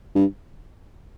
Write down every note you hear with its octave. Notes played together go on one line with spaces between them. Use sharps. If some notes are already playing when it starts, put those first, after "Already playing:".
G2